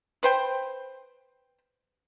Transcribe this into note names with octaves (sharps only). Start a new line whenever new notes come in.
B4 C5 G5